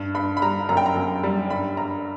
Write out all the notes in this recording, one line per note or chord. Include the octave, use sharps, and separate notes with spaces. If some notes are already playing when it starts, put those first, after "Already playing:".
Already playing: G2
G2 B5
B5
G3 A#5
F#2 A#5
G5
A#5
F#2
G3
G2 B5
G2 A#5